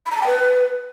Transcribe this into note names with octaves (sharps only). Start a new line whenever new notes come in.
B5
A#5
A5
G5
B4